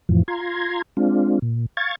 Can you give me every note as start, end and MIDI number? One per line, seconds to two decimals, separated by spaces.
0.09 0.23 41
0.09 0.23 45
0.09 0.23 52
0.09 0.23 53
0.28 0.82 65
0.28 0.82 82
0.28 0.82 84
0.28 0.82 92
0.97 1.39 56
0.97 1.39 60
0.97 1.39 62
0.97 1.39 65
1.42 1.66 46
1.77 1.95 77
1.77 1.95 85
1.77 1.95 92
1.77 1.95 93